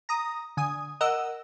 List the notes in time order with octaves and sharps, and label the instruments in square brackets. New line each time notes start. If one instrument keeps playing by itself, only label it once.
[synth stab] A#5 D#6
D3 G#5 D#6
A#4 D#5 F#5 E6